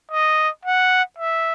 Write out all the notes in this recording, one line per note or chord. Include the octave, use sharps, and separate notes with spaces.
D#5
F#5
E5